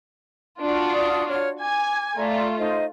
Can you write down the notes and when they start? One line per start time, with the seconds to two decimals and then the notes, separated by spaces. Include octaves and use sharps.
0.60 D4 F4 F#4
0.93 D5 D#6
1.29 C#5 F6
1.60 G#5 D6
2.17 A3 F4 D5 E5 A#5
2.59 D#4 C5 D#5